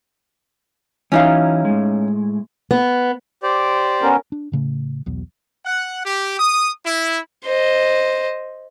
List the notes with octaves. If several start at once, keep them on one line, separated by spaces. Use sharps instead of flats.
E3 F#3 C#4 D#4 E4 F5
A2 G#3
B3
G4 C5 D5
B3 C#4 A#4
D4
A2 C#3 A3
B1 E2 B2
F#5
G4
D#6
E4
C5 D#5